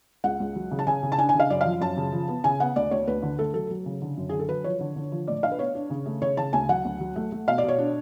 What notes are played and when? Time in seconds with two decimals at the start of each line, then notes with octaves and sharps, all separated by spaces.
0.24 C#2 F#5
0.40 C#2
0.56 F#3
0.71 C#3
0.79 A5
0.87 C#3 G#5
1.03 C#3
1.12 A5
1.18 D4 G#5
1.29 G#5
1.34 C#3
1.40 F5
1.50 F#2 D5
1.61 F3 F5
1.81 F#2 A5
1.97 C#3
2.13 F3
2.28 B3
2.44 C#3 G#5
2.60 B3 F#5
2.76 D2 D5
2.91 D2 C#5
3.07 D2 B4
3.22 D3
3.39 A3 A4
3.54 F#3 A4
3.70 F#3
3.86 C#3
4.02 D3
4.17 F#2
4.29 D3 G#4
4.39 A4
4.49 F#3 B4
4.64 F3 C#5
4.80 D3
4.96 D3
5.12 F3
5.27 A2 D5
5.43 D4 F5
5.51 B4
5.59 B3 C#5
5.75 D4
5.90 C#3
6.06 A3
6.22 C#3 C#5
6.37 C#3 A5
6.53 D2 G#5
6.69 F#3 F#5
6.85 D2
7.00 F#3
7.16 A3
7.32 A3
7.48 B2 F5
7.58 D5
7.63 B2
7.68 C#5
7.78 D4